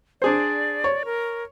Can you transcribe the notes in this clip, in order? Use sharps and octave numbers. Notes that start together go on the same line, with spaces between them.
D4 G#4 C5 D5
C#5
A#4